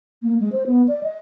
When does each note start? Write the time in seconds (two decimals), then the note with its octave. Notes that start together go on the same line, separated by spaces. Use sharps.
0.23 A#3
0.40 G#3
0.52 C5
0.67 B3
0.88 D5
1.03 D#5